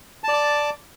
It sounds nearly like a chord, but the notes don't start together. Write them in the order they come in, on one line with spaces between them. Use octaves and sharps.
A5 D5 D6